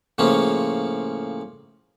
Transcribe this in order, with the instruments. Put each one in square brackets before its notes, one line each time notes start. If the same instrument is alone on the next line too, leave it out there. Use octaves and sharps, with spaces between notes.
[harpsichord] A2 C#3 F3 A#3 C#4